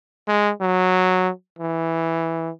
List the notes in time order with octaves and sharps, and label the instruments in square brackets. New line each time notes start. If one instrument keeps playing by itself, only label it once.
[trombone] G#3
F#3
E3